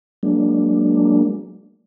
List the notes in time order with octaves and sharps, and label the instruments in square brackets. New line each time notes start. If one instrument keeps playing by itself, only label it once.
[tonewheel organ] F#3 G#3 A#3 D4